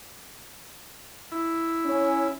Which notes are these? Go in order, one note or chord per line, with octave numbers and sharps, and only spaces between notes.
E4
C#4